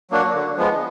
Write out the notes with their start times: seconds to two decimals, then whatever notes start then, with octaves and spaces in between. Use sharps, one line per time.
0.11 F#3 A#3 D4 F#4
0.34 D3
0.57 F3 G#3 B3